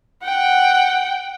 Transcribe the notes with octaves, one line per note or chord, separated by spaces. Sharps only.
F#5 G5